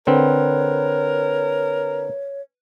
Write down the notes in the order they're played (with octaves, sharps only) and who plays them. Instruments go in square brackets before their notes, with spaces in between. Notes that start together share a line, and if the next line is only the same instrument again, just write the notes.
[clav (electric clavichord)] D3 C4 [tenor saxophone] A#4 [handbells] B4 [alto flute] C#5